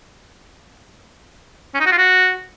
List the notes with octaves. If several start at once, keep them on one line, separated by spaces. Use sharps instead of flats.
C#4
D#4
F#4
F4
F#4